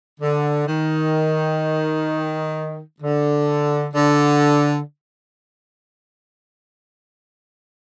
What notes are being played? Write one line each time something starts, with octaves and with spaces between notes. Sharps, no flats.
D3
D#3
D3
D3